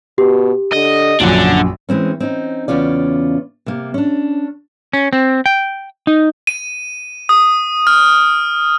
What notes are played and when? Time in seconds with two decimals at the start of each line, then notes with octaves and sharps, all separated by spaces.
0.18 B2 G4
0.73 D3 D#5
1.21 A#1 F#2 F#3 D4 F#5
1.89 E3 G#3 C4 C#4
2.20 C4 C#4 D#4
2.68 E2 C#3 C#4 F4 D5
3.66 C3 A#3
3.94 C#4 D4
4.93 C#4
5.13 C4
5.46 G5
6.07 D#4
6.47 D#7
7.29 D#6
7.87 F6